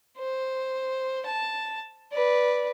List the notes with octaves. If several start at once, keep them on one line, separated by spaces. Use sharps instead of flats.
C5
A5
B4 D5